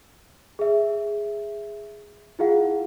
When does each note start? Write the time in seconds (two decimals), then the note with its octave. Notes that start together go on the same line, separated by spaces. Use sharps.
0.59 G#4 E5
2.39 E4 F4 G#4 F5 F#5